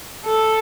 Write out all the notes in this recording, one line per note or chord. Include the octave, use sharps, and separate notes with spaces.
A4